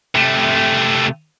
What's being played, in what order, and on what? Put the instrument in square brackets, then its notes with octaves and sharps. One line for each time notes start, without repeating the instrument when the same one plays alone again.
[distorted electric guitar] C3 A3